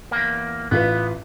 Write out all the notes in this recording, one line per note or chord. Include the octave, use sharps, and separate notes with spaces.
E2 A#3
A1 B3 F4 B4